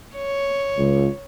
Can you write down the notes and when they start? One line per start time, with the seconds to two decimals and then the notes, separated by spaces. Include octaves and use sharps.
0.16 C#5
0.78 C#2